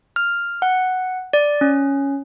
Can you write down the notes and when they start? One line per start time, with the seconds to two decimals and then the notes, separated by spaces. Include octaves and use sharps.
0.16 F6
0.62 F#5
1.33 D5
1.61 C#4